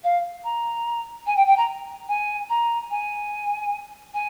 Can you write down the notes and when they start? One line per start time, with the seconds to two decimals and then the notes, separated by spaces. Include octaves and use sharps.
0.03 F5
0.43 A#5
1.26 G#5
1.36 G5
1.46 G5
1.57 A#5
2.08 G#5
2.49 A#5
2.90 G#5
4.13 G#5